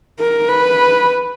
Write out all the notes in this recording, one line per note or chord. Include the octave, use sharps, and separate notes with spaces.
A#4
B4